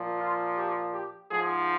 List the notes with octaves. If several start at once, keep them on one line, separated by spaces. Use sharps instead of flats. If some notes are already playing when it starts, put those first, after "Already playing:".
Already playing: A#2 F3
F4
G4
G4
G#2 F3 G#4